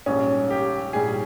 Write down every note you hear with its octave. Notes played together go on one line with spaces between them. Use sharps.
A#1 G#2 G3 C#4
G4
A#1 G#2 G3 G#4